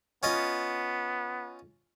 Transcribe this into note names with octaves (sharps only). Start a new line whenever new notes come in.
B3 C#4 F4 D#5